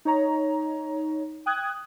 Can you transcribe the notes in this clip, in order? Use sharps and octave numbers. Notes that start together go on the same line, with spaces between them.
D#4 C#5 A#5
G5 D#6 F#6 G#6